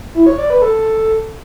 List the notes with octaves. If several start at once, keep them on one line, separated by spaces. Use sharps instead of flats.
E4
C#5
D5
B4
A4